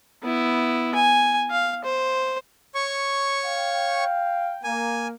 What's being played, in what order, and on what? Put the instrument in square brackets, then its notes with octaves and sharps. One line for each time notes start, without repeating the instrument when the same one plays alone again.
[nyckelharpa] B3 E4
G#5
F5
C5
[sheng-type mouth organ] C#5 C#6
[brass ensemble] F5 G5
[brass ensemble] A#3 [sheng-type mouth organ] G#5